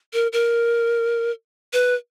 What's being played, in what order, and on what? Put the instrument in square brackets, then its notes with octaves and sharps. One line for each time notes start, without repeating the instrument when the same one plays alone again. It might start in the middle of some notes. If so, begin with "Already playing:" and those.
[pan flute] A#4
A#4
B4